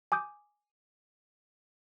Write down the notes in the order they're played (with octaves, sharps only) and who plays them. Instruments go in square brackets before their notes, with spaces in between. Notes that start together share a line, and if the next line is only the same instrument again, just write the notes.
[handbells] G#5 D6 D#6 G6